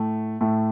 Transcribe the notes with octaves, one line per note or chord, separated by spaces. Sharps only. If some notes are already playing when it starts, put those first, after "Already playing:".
Already playing: A2 A3
A2 A3